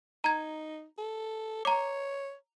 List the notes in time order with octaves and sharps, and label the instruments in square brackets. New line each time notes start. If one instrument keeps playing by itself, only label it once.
[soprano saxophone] D#4 [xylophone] A#5 G#6
[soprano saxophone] A4
[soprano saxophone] C#5 [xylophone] A#5 D6